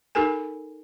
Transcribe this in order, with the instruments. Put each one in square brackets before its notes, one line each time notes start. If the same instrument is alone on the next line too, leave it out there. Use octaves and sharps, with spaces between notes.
[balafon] D#4 G4 A4 A#4 G#5